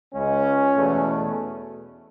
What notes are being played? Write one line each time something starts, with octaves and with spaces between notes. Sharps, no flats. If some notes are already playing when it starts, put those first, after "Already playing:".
C#2 C#3 G#3 C#4
E2 B2 A3